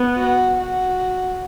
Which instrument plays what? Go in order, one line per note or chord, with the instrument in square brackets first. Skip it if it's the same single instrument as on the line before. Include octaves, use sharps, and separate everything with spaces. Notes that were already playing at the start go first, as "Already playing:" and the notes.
Already playing: [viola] B3
[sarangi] F#4
F#4